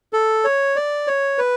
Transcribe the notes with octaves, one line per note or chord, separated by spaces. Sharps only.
A4
C#5
D5
C#5
B4